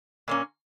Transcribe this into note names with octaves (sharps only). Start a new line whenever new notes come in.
A#2 A#3 C#4